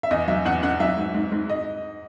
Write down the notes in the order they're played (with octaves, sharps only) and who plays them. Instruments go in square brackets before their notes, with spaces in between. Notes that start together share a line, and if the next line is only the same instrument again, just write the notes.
[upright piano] E5
E2 D#5
F#3 E5
E2 F#5
C#4 F#5
F#3 E5
G#2
G#2
G#2
D#5